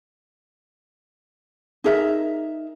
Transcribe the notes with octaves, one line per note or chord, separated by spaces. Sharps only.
D#4 G#4 A#4 E5